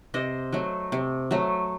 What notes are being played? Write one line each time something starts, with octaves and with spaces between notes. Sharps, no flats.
C3 C5 D#5
F#3 A3
C3
F#3 A3